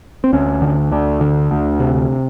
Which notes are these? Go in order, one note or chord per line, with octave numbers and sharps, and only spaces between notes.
C4
D2 C#4
D3
D2 D4
D3
D2
C3